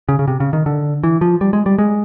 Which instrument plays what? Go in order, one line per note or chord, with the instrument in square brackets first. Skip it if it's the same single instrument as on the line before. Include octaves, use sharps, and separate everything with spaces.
[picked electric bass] C#3
C#3
C3
C#3
D#3
D3
E3
F3
G3
G#3
G3
G#3